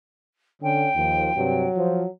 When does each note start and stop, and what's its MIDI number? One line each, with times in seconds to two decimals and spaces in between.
0.63 0.87 50
0.63 0.91 61
0.63 1.66 79
0.96 1.28 39
0.96 1.34 53
1.36 1.66 43
1.36 1.66 48
1.36 2.08 54
1.76 2.03 53